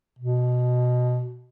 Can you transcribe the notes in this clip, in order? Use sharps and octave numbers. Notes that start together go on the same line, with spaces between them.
B2